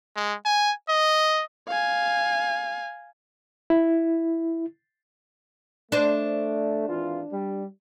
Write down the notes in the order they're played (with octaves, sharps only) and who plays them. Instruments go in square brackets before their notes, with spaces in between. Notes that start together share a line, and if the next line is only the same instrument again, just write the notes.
[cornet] G#3
G#5
D#5
[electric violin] F5 G#5
[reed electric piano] E4
[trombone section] A3 [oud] D4 C5
[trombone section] G#1 E3 F4
G3